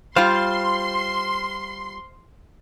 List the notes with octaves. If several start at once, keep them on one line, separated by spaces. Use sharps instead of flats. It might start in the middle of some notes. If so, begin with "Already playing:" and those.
G3 F4 C5 F5 C6